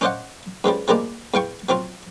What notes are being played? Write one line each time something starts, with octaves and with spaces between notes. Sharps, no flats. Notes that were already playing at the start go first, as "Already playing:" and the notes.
C#4 D4 C5 D#5 F5 F#5
G2 C#3 F3 G3
F3 G3 G#3 A#3 D4
E2 F5 G5 C#6
F3 F#3 C4 F4